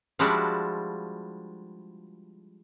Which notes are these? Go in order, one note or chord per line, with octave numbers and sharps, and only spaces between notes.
F3 G3 G#3 D4 E4 F#4